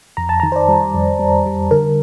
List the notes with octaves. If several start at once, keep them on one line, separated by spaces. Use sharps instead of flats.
F2 A#5
A5
D#3 A#5
C5
D5
G3
F2
G3
G3
D3 A#4